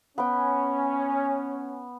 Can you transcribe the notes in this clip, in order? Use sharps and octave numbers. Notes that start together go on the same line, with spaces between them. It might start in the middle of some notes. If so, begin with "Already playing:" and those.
B3 C#4 G5